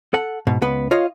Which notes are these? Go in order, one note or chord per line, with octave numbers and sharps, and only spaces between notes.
A4 F#5
G#2 B2
C#2 B3 B4
F4 C#5 D#5 F5